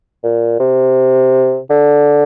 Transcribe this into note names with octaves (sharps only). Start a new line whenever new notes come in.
A#2
C3
D3